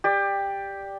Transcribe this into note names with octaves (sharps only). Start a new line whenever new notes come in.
G4 D5